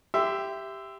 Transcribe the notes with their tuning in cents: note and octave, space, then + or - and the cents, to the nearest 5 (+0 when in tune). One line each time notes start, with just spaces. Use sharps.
G4 +0 E5 +5 C6 -25